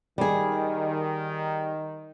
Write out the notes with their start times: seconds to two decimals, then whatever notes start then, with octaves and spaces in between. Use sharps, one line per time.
0.18 D#3 G3 G#4